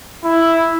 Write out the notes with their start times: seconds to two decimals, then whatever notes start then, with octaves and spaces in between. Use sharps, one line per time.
0.25 E4